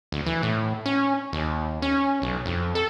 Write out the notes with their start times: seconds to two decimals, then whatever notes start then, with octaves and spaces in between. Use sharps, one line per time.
0.12 D2
0.26 E3
0.43 A2
0.86 C#4
1.33 D#2
1.82 C#4
2.22 B1
2.46 F2
2.75 A4